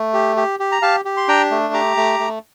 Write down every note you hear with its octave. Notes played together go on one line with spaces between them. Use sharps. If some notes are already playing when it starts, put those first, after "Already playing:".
Already playing: A3
G4
G4
G4
A#5
G4 F5 A5
G4
C6
D4 G5 A#5
A3
G4 A#5 D6
A3
A3